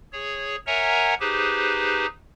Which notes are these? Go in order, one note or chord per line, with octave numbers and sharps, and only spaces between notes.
G#4 C#5
A#4 C#5 E5 F#5 G#5 A#5
D#4 G4 G#4 B4 C5